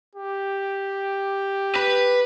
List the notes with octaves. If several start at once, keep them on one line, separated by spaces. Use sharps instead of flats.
G4
B4